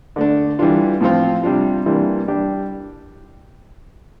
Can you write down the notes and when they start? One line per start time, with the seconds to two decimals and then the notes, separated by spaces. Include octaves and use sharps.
0.16 D3 A3 D4
0.59 E3 G3 D4 F4
1.01 A2 F3 C4 F4
1.43 C3 G3 D4 F4
1.86 C3 E3 G3 A#3 D4
2.28 G3 D4 G4